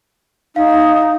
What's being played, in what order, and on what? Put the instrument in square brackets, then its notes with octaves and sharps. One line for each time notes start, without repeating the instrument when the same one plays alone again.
[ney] D#4 [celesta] F5